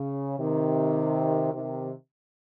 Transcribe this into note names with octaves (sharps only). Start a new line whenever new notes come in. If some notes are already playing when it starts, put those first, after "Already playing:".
Already playing: C#3
C3 D#3
C3 D#3